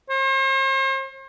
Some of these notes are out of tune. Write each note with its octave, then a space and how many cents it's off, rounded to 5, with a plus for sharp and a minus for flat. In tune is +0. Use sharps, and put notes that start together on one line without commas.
C5 +45